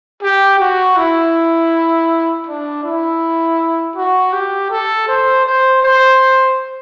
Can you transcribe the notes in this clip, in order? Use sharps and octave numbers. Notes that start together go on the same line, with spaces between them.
G4
F#4
E4
D4
E4
F#4
G4
A4
C5
C5
C5